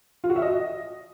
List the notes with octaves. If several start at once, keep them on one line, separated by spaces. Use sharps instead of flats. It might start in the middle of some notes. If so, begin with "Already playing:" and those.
F4
F#4
E5
D#5